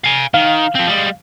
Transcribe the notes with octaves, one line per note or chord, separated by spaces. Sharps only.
F5 G#5
D#3 F5
F3 C4
G3 G#3